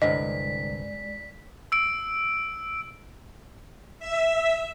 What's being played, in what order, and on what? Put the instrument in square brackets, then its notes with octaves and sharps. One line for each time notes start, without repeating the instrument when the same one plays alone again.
[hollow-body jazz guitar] C2 G2 D3 [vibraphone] G#3 D5 [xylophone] D#5 [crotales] B6
[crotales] E6 D7
[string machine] E5